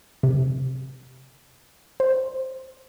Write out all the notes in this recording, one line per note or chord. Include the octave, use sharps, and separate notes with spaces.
C3
C5